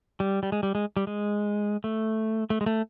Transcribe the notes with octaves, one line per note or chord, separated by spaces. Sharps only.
G3
G3
G#3
G3
G#3
G3
G#3
A3
A3
G#3
A3